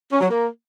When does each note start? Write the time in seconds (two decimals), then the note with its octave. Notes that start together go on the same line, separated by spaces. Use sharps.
0.12 C#4
0.21 F#3
0.30 A#3